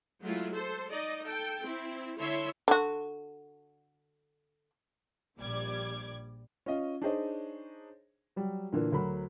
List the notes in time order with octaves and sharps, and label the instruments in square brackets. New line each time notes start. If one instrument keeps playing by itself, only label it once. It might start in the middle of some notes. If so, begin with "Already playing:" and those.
[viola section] F#3 G#3 A3 E4 F4
A4 C5
D#4 D5 D#5
A4 G5
C4 E4
D3 E4 A4 C#5 E5 C6
[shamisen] D3 F#4
[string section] A#1 A#2 G3 D5 D6 G#6
[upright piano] C#4 F4 D#5
D4 D#4 G#4 C5 C#5 D#5
F#3 G3
A#2 D3 E3 A#3
D2 F#3 A#4 B5